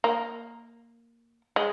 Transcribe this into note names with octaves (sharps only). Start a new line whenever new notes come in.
A#3
G#3